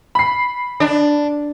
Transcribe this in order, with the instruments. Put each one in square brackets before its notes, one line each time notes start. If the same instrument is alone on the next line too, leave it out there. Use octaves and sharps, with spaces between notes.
[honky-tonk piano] B5 C7
[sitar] D4